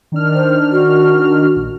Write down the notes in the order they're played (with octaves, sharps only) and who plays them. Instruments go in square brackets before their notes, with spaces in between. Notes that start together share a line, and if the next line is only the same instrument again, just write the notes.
[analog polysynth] D#3 D4 F6
[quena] C5
F#4
[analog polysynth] A#1